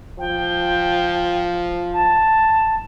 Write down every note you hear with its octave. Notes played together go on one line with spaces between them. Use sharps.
F3 G5
A5